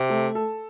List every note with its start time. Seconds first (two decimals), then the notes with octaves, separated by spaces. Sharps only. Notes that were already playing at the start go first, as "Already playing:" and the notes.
Already playing: C3
0.10 A3
0.35 A4